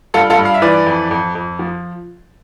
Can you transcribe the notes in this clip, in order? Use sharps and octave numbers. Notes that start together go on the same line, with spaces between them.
G2 F4 A4
F4 A4
G2
F5
E5
E3 B4 D5
F2
F2
F2
F3